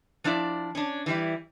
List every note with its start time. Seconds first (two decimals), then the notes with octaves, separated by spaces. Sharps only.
0.24 F3 D4 E4 D5
0.75 C#4 D4
1.06 E3 G3 E4